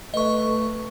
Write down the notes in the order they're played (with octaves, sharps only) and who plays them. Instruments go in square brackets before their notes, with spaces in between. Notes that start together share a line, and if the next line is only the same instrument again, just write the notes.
[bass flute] A3 [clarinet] B4 [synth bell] D#5 C#6